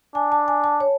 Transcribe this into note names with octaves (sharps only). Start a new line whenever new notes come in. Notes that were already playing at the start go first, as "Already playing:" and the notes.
D4 G#5
A5
G#5
A5
C#5